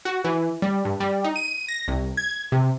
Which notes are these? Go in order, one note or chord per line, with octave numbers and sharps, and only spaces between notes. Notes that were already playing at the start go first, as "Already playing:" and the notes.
F#4
E3
G3
G2
G3
D#4
D#7
A#6
C2
G#6
C3